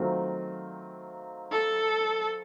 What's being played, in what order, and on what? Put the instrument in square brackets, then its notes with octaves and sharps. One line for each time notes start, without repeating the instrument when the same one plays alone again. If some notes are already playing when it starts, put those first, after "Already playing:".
Already playing: [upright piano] D#3 F#3 A3 C4 F4
[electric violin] A4